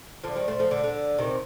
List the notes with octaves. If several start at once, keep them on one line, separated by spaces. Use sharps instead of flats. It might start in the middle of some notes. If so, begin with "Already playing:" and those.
D3 F3
D#3 G3
A3 C4
F3 A3
D3
D3
C3 D#3